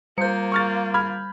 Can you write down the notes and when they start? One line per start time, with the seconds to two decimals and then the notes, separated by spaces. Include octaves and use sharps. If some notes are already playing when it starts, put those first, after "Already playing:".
0.18 G3 A#3 F4 C5 G6 C#7
0.52 C#6 F6 A6
0.94 B5 F6 G#6